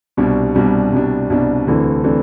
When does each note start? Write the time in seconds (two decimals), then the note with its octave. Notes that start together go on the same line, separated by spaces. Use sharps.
0.17 C2 B2 G3 D4
0.55 C2 B2 G3 D4
0.92 C2 B2 G3 D4
1.30 C2 B2 G3 D4
1.67 D2 C3 E3 A3 D4
2.04 C3 E3 A3 D4